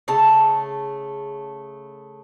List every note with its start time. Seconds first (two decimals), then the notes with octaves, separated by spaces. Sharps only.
0.08 C#3 A3 A5